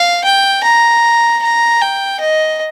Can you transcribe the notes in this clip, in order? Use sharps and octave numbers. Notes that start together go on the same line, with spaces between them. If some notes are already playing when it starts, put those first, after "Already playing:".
Already playing: F5
G5
A#5
A#5
G5
D#5